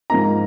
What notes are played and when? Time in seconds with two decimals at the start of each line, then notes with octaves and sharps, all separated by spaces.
0.10 G#2 F3 A#3 D#4 A#5